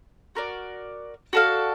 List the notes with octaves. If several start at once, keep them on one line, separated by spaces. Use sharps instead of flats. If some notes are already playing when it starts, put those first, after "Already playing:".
F#4 A#4 D5
F#4 A4 D5 F5